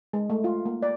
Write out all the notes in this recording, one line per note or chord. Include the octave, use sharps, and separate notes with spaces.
G#3
A3
F4
A#3
D5